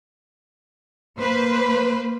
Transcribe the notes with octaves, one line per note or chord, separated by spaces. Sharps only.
A#3 B4 C5